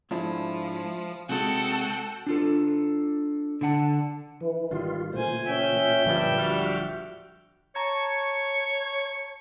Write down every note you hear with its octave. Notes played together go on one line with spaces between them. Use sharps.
G#2 F3 D4 E4
C3 G#3 D#4 F#4 A4 F#5 G5
D4 F4 A4
D3 D4 F#5 A5
E3
G#1 D#3 G3 F4
A#2 C#3 E3 A3 C5 G#5
C#4 E5 G5
D1 G2 D3 F3
G3 F#4 F6
C#5 A5 A#5 C#6 G#6